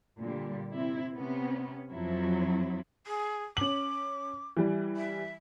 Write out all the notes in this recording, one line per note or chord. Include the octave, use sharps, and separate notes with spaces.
A#2 D3 G3
C3 C4 E4
C3 B3 C#4
F2 F3 F#3 E4
G#4
C#4 D6 F#7
E3 G3
E5